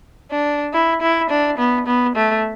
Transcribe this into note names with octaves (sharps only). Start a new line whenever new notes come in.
D4
E4
E4
D4
B3
B3
A3